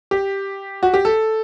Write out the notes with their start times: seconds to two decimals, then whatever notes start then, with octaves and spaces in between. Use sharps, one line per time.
0.11 G4
0.83 F#4
0.94 G4
1.05 A4